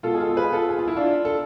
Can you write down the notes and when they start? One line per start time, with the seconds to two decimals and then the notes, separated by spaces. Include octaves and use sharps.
0.03 B2 G#3 F4 A4
0.14 G#4
0.20 F4 A4
0.36 G#4 B4
0.53 F4 A4
0.69 G#4
0.79 F4
0.88 E4
0.96 D4 F4
1.25 A4